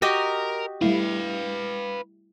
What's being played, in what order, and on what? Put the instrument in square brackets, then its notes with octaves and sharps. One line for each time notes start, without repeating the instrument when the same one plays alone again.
[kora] F#4 G4 D#5 [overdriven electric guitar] A#4
[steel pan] G3 A3 E4 [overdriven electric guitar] B4 F5